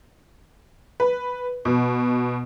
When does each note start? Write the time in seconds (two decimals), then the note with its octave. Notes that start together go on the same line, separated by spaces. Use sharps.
1.00 B4
1.65 B2